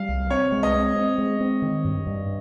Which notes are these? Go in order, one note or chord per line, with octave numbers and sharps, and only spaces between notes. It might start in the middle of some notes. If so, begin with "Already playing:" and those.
Already playing: G3 F5
C2
C4 C#5
G#3
D#5
C4
C4
G#3
C4
D#3
G2
G2